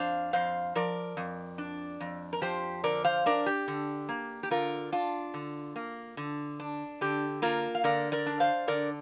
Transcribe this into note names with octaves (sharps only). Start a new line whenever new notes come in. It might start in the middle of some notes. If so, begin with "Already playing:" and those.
Already playing: F2 D4 C5 F5
F2 C5 F5
F3 A#4 D5
F2
D4
F2
A#4
F3 G4 C5
D3 A#4 D5
C5 F5
D4 A#4 D5
G4
D3
A#3
G4
D3 F4 A#4
D4 F4
D3
A#3
D3
D4
D3 G4
A#3 F4 A#4
F5
D3 A#4 D5
A#4 D5
D4
C5 F5
D3 A#4 D5